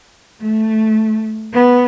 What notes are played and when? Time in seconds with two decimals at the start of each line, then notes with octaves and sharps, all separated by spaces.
0.41 A3
1.53 B3